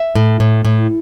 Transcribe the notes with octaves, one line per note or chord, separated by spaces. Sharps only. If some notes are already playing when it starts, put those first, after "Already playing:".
Already playing: E5
A2
A2
A2